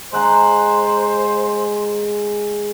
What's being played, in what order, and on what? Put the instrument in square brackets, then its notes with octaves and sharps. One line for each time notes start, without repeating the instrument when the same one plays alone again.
[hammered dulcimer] G#3 F#5 A#5 [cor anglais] C5